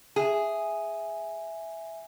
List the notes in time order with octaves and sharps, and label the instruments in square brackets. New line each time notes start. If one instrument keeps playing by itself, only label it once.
[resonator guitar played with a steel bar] G#4 [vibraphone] E5 G#5